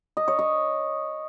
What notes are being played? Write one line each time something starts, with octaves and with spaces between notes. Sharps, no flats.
D#5
C#5
D#5